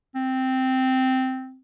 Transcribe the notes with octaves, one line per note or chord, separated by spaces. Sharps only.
C4